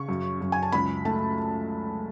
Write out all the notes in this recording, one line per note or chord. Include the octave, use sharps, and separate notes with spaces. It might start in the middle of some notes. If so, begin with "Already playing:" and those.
Already playing: C#3 C#6
F#2
F#2
G#5
A5
C#2 B5
A3 A5